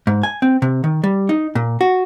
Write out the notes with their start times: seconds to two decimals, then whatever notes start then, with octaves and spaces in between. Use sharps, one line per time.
0.07 G#2
0.23 G#5
0.42 C4
0.62 C3
0.84 D#3
1.04 G3
1.29 D#4
1.55 A#2
1.81 F#4